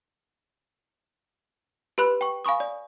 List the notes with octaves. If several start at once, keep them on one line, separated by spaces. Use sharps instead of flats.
G4 B4 B5 F#6
G5 C#6
F5 G#5 B5 C#6 D#6
D5